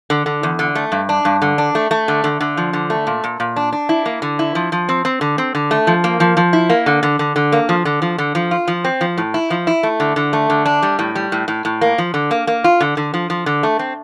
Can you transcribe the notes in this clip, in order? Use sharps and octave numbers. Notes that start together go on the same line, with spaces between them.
D3
D3
E2
D3
A3
G2
D4
G2
D3
D4
A3
A3
D3
D3
D3
F3
D3
A3
A#2
A#2
A#2
D4
D4
E4
A#3
D3
E4
F3
F3
C4
C4
D3
C4
D3
A3
F3
A#3
F3
F3
E4
A#3
D3
D3
D3
D3
A#3
F3
D3
F3
D3
F3
F4
F3
C4
F3
A2
E4
F3
E4
A3
D3
D3
A3
D3
D4
G3
A2
G3
A2
A2
A2
A#3
F3
D3
A#3
A#3
F4
D3
D3
F3
F3
D3
A3
C4